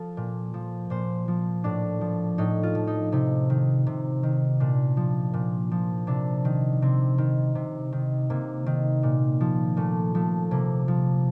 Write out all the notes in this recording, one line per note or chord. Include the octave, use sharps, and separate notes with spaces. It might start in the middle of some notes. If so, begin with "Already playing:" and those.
Already playing: F3 A4
A#2
F3
A#2 C5
F3
A2 D4
F3
A2 D#4
F4
F3
D#4
C3 D#4
D#3
C3
D#3
A#2 D4
F3
A#2
F3
C3 D4
D#3
C3 C4
D#3
C3
D#3
C3 A#3
D#3
A#2
F3
A#2 A3
F3 A3
C3 A#3
F3